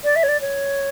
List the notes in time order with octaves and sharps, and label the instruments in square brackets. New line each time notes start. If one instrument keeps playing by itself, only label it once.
[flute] D5
E5
C#5
D5
C#5